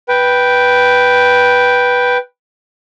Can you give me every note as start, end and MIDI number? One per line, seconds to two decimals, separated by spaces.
0.08 2.17 71
0.08 2.17 79